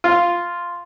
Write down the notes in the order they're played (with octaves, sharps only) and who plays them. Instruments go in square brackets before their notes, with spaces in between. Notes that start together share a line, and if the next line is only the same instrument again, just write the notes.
[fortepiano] F4